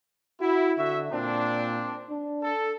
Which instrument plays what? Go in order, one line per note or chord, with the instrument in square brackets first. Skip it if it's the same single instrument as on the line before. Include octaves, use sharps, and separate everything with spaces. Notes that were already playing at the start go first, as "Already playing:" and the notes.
[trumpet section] E4 [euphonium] F#4
[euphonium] D3 [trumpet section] F#4 E5
[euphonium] A#2 [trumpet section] C4 D4
[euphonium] D4
[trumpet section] A4